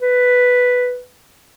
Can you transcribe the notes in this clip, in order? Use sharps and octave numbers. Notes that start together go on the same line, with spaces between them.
B4